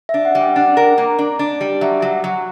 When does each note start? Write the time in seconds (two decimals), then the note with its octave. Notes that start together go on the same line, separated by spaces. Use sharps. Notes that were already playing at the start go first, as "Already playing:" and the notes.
0.09 E5
0.14 D4
0.25 F#5
0.35 G3
0.41 G5
0.56 D4 F#5
0.77 A#4
0.98 A#3
1.19 D4
1.39 D4
1.61 G3
1.81 F#3 E5
2.02 F#3
2.24 F#3